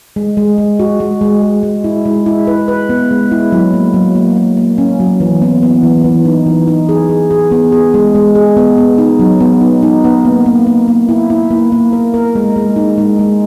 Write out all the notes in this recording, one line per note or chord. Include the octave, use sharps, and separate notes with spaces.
G#3
G#3
G#3
F#4
G#3
G#3
G#3
G#3
E4
G#3
E4
B4
B4
B3
G#3
E4
F#3
A#3
F#3
A#3
A#3
A#3
C#4
F#3
E3
B3
B3
E3
E3
D#4
E3
D#4
G#4
G#4
G#4
B3
G#4
G#3
G#3
G#4
B3
B3
D#4
F#3
B3
D#4
D#4
B3
A#3
A#3
A#3
A#3
E4
E4
A#3
A#3
A#4
A#4
G#3
G#3
D#4
G#3
G#3